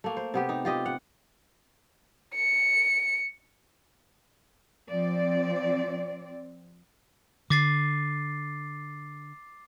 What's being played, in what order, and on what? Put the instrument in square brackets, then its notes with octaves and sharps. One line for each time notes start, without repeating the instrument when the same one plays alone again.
[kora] A3 A#3
C5
C3 B3 G4
D#4
F4 G4 D#5
F#5
[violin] C#7
[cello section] F3 C4 D5
[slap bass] D3 [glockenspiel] D6 A6 C7